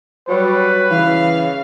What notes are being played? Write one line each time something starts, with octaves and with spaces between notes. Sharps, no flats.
F#3 G3 B4
C#3 E3 F5